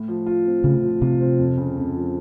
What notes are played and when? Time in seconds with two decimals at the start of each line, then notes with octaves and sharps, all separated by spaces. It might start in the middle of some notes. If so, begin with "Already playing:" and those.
Already playing: A2
0.08 F3
0.26 F4
0.45 C4
0.64 A2 C#3
0.83 F3
1.02 C3 F4
1.20 C4
1.39 F2
1.57 C#3
1.77 F2
1.95 F3